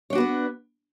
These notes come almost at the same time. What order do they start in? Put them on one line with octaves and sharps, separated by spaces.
C#5 D4 F#4 B3 B4